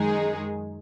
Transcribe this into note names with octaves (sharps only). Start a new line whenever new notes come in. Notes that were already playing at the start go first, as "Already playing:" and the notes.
Already playing: F#2 D#3 G#3 D#4 G#4